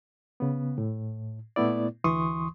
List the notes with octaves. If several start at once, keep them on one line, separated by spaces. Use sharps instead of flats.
C#3 B3
A2
A#2 A3 B3 E4 D5
D2 E3 C6 C#6 D#6